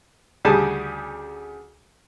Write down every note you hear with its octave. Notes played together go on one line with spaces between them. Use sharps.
D2 C#3 G3 G#4 G#5 A5